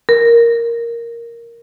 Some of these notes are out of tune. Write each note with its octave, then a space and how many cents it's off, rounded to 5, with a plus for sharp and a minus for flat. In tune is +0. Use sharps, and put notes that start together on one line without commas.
A#4 +0